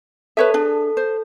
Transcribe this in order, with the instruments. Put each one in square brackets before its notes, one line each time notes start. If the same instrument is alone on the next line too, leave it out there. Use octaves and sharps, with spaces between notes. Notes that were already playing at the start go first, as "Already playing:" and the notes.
[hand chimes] A4 [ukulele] B4 C#5 E5
[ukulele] D4 G#4
C5